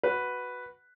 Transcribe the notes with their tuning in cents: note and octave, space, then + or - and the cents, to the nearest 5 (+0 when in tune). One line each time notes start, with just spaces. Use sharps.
F#4 +0 B4 +0